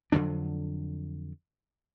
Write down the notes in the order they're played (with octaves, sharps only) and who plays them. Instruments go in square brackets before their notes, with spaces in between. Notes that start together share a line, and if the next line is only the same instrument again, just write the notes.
[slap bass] F2 D3 F#3 D4